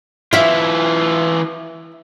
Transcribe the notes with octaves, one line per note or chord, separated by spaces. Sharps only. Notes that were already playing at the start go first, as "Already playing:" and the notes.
E3 E4 F4 E5